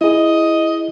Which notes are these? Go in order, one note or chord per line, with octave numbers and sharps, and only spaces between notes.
E4 G#4 D#5